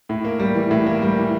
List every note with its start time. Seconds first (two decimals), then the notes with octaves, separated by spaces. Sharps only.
0.09 A2
0.24 A#3
0.40 G3
0.55 E3
0.71 A2
0.86 A#3
1.02 G3
1.18 E3